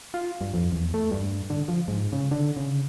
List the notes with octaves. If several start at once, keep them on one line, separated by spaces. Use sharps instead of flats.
F4
G2
F2
E2
A3
G2
D3
F3
G#2
C#3
D3
C#3